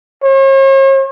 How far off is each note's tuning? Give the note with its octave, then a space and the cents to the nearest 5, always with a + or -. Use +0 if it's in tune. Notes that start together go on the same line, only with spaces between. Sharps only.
C#5 -45